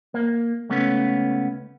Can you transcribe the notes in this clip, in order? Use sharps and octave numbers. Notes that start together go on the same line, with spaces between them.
A#3
C#2 A3 B3 C#4